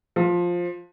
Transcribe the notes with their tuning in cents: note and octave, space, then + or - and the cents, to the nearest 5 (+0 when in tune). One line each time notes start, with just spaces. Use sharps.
F3 +10